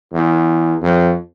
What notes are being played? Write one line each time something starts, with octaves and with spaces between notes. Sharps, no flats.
E2
F2